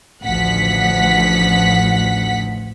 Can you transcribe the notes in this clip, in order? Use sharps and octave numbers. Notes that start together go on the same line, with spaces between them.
A1 D2 F3 F#5 B6